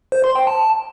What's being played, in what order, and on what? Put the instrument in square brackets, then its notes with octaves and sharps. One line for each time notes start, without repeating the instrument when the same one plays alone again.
[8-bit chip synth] C5
C6
G5
A5